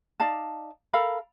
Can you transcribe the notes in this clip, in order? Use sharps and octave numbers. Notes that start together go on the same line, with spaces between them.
D#4 D5 F5 A5
A4 A#4 F5 B5